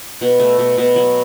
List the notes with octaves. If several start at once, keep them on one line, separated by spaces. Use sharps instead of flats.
B2
A3
B2
B2
F#3